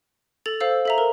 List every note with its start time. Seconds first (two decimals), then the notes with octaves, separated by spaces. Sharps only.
0.46 A4 A6 F7
0.60 A4 C5 F5 E6
0.85 A4 E5 A#5
0.98 A#4